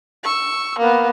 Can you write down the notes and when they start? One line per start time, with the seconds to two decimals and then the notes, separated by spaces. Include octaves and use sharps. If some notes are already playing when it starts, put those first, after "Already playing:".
0.24 C#6 E6
0.78 A#3 B3